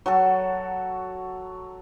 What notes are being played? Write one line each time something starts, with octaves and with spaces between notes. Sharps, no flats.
F#3 F#4 A4